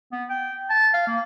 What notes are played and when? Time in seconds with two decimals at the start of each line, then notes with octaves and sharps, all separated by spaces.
0.12 B3
0.30 G5
0.70 A5
0.94 F5
1.07 A#3